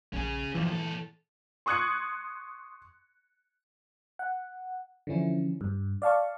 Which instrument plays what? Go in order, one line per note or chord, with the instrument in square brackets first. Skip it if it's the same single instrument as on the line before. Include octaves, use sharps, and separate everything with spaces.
[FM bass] A#1 [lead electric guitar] C#4 G#4
[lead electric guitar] D#2 F3 [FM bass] E3
[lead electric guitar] A#2 A4
[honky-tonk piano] C6 C#6 D#6 F#6 G#6 C#7
[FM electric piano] F#5
D3 E3 F3 C#4 E4
G2
D5 F5 A5 C#6